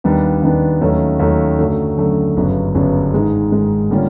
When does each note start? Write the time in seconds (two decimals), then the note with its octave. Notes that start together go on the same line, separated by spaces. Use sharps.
0.04 D#2 D#3 G3 B3 D4
0.42 D#2 D#3 G3 B3 D4
0.81 D#2 D#3 F#3 A3 C#4
1.19 D#2 D#3 F#3 A3 C#4
1.59 F#2 D3 F#3 A3
1.98 F#2 D3 F#3 A3
2.36 G1 F#2 C#3 F#3 B3
2.75 G1 F#2 C#3 F#3 B3
3.14 G#2 D#3 G#3
3.52 G#2 D#3 G#3
3.91 D3 G3 A#3 C#4 F4